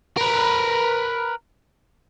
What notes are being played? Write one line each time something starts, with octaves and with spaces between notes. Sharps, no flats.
A#4 B4